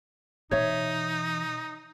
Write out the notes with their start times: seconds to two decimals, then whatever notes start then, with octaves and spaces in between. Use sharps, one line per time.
0.51 B2 E3 D#4 C#5 E5